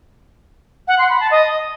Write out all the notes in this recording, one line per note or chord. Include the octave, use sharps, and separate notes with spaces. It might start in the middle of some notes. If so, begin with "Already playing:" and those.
F#5
C6
B5
A5
D#5